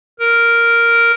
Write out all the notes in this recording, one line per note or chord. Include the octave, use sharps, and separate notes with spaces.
A#4